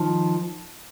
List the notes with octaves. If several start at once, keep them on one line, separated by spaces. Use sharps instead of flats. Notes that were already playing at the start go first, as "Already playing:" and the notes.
Already playing: D#3 F3